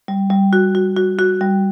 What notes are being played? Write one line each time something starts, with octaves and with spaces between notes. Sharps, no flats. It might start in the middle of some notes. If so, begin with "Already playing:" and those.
G3
G3
F#4
F#4
F#4
F#4
G3